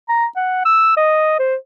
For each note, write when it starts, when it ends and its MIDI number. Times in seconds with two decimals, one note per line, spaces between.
0.08 0.26 82
0.36 0.64 78
0.65 0.94 88
0.97 1.38 75
1.39 1.56 72